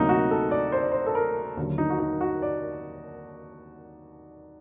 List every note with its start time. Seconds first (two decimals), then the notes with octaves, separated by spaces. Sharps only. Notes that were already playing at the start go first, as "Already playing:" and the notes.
Already playing: D2 C3 F#3 A#3 D#4
0.09 F#4
0.31 A4
0.51 D5
0.72 C5
0.82 D5
0.92 C5
1.07 A4
1.15 A#4
1.57 D#2 D3 F#3
1.78 D#4
1.90 F#4
1.99 D#4
2.21 F#4
2.42 D5